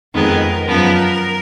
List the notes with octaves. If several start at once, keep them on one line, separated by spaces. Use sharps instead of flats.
F2 D#3 G#3 B3 A#4
F#2 F3 B3 A#4